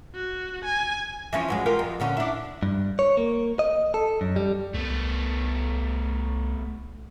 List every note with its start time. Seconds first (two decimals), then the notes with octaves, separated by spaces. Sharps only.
0.15 F#4
0.65 G#5
1.33 E3 F3 C#4
1.48 G2 F#3 G#3
1.66 F4 G4 A#4
1.79 F2
2.00 A#2 D3 C#4
2.17 D4 E4
2.63 G2
2.99 C#5
3.17 A#3
3.59 D#5
3.94 A4
4.21 F#2
4.36 G3
4.74 C2 A3 B3